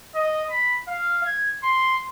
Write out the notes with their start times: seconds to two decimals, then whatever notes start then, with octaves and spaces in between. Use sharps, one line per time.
0.15 D#5
0.50 B5
0.88 F5
1.24 G#6
1.63 C6